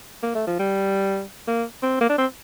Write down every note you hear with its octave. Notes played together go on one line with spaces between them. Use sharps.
A#3
A3
F3
G3
A#3
C4
A#3
D4
C4